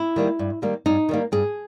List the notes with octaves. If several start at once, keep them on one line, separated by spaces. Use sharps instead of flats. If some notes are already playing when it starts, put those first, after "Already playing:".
Already playing: E4
D#3 G3 A#3
G2
D#3 G3 A#3
G2 D#4
D#3 G3 A#3
G2 G#4